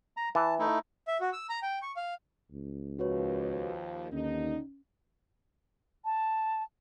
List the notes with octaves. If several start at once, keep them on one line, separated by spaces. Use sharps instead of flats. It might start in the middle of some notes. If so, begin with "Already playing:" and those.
A#5
E3 A5
A3 D#4 E4
E5
F#4
E6
A#5
G5
C#6
F5
C#2
D#2 F3 F#4 B4 C#5
D#2 D3 C#4 D#4
A5